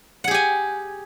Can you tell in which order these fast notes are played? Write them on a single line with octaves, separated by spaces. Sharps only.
F#5 G#4 G4 G#5